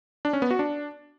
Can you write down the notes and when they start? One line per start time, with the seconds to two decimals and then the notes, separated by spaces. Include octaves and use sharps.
0.25 D4
0.33 C#4
0.42 B3
0.51 F#4
0.59 D4